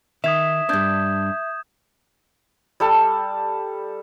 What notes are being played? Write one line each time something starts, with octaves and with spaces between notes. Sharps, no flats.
D#3 E5 D#6 G#6 E7
G2 D4 D#6 G6 G#6
G3 A4 A5